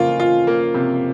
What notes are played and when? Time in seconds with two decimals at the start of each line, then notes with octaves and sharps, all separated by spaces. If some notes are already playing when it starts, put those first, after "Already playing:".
Already playing: C#3 F3 A#3 F4
0.20 F4
0.47 A#3
0.74 C3